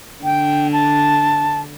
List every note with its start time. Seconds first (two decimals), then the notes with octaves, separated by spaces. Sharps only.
0.24 D3 D4 G5
0.73 A5